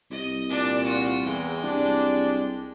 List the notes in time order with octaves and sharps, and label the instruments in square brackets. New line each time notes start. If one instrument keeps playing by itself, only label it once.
[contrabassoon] C2 [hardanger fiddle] D#5
[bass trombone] A#2 [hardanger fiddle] D4 D5
[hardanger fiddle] F4 F#4
[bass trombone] E2 [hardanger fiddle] G#3 G5
[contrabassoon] C2 [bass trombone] D4